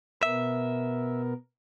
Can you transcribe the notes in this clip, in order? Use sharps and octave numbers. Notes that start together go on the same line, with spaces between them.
B2 B3 A#4 E5